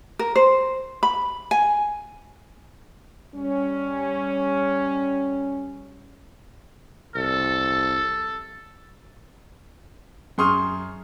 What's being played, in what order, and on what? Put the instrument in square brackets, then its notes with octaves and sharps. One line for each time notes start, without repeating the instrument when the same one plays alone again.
[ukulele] A#4
C5
B5
G#5
[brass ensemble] G3 C#4
[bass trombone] C2 [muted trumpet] A4
[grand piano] F#2 G#4 C6 C#6 D#6 F6